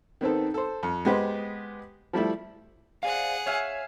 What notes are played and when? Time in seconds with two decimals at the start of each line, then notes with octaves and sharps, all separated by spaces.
0.21 D#3 B3 C4 A4
0.54 A4 C5
0.83 F2
1.05 G#3 B3 G4 B4 C5
2.13 F3 G3 A3 E4
3.03 G#4 C5 D5 F5 F#5
3.46 C#5 E5 F5 G#5